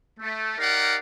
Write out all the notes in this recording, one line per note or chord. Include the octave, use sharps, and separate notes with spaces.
A3
D#4 G4 A#4 D5 F5 F#5